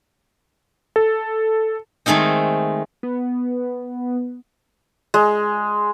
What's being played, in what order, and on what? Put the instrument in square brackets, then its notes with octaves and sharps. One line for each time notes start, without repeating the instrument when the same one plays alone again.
[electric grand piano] A4
[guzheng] D#3 G#3 A3 C4 D#4
[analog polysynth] B3
[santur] G#3